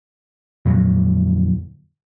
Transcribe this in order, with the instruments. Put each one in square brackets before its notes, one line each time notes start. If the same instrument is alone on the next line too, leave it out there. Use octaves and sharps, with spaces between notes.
[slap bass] F2 A#2 D3 F#3